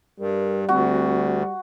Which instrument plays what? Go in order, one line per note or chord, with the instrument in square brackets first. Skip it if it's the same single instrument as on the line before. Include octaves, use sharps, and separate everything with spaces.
[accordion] G2 [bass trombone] G3 [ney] A#4
[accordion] D2 [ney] C4 [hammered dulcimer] F#4